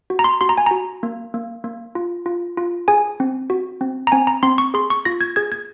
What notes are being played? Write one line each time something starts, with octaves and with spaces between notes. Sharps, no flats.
F#4
A#5
C6
F#4 C6
A#5
G#5
F#4 A#5
A#3
A#3
A#3
F4
F4
F4
G#4 G#5
C4
F#4
C4
A#5
C4 G#5
A#5
C4 C6
C#6
G#4 C6
C#6
F4 A#6
G#6
G#4 G#6
G#6